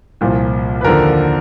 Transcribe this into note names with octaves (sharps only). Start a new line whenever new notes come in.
C2 A#2 F3
B4
D#2 D3 F3 A#4 C5